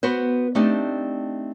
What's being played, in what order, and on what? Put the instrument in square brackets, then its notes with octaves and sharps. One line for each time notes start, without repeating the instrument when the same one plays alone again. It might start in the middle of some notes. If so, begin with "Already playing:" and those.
[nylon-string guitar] B3 F#4 B4 C5
A3 C4 D4 D#4 G4